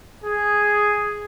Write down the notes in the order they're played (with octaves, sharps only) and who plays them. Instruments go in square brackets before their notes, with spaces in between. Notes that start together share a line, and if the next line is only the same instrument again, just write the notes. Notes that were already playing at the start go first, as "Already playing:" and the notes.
[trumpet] G#4